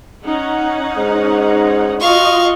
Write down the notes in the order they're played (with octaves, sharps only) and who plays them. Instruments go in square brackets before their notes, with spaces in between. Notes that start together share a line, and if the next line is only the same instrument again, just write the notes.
[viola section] C#4 D#4 F#5
[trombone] G#2
[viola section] F4 F#4 D#5 [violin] F5 C#6